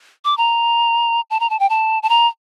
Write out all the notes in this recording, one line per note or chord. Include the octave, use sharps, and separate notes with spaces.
D6
A#5
A5
A#5
A5
G5
A5
A5
A#5